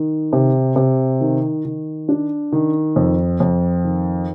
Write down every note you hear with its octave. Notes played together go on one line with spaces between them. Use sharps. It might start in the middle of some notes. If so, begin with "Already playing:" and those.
Already playing: D#3
C3
C3
D#3
D#3
D4
D#3
F2
F2
D#3